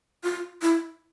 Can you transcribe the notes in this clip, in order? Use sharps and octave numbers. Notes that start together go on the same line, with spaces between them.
F4
E4